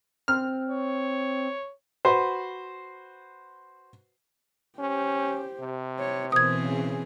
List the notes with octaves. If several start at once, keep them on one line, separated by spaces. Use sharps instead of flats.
C4 F6
C#5
F#4 B4 C5
C#4 G4 C5
C3
C#5
B2 E3 C4 A#4 C5 D#6 G#6
C#3 C#4 G#4